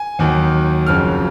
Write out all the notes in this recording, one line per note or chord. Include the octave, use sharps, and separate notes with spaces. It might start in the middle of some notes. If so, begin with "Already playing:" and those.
Already playing: G#5
D#2 D#3 F#3
F#1 F2 C#3 F#3 F6